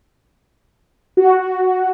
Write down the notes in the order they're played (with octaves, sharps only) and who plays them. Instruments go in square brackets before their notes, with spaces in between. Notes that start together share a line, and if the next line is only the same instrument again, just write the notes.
[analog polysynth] F#4